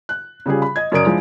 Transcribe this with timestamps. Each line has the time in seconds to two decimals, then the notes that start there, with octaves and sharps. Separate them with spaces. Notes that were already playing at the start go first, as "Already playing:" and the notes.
0.09 F#6
0.46 C#3 G3 F4 G#4
0.62 B5
0.76 D#5 G#6
0.92 F#2 C#3 A#4 D5 D#6 D7
1.06 F3 G#3 D4 E4